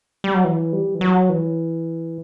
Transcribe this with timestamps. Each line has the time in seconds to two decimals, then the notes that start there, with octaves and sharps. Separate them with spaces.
0.24 G3
0.34 F#3
0.44 E3
0.73 G3
0.95 E3
1.01 F#3
1.29 E3